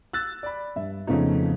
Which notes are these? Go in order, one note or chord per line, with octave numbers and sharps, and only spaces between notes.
E6 F#6 A6
D5 B5
G2 E5
F2 C#3 A3 B3 D#4